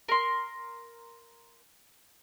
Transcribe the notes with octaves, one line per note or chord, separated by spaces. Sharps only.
A#4 C6